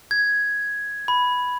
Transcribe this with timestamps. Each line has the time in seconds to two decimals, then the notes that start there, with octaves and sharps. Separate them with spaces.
0.11 G#6
1.08 B5